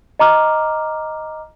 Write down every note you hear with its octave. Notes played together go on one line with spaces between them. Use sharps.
D#5 A#5 D6 F6